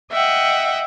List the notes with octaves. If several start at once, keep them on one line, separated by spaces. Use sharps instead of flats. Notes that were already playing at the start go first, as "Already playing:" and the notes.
D#5 E5 F#5 G5